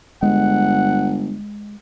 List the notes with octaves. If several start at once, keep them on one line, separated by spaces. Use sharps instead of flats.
G1 G#3 F#5